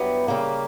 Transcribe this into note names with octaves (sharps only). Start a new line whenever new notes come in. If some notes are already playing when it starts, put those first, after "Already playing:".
Already playing: G2 F#3 B3 E4 G4
C#3 G3 A#3